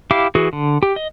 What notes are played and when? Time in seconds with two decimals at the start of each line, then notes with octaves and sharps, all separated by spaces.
0.11 E4 G4 F5 D6
0.35 E3 F#4 G#4
0.53 D3
0.83 G4
0.96 D#5